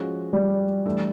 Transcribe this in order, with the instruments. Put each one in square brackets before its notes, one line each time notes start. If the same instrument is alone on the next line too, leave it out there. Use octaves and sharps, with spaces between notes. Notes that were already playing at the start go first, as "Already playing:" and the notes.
Already playing: [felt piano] F3 G#3 C#4 F#4
[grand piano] G3
[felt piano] E3 A3 D4